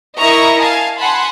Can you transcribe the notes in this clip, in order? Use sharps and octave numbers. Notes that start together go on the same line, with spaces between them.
E4 A#4 D#5 E5 A#5 C#6
F5 G#5 A5
F#5 G#5 A5 B5 C6